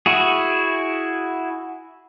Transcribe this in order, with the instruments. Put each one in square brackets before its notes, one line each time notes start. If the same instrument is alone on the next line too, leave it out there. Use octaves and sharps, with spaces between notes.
[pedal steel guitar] E4 F#4 G#4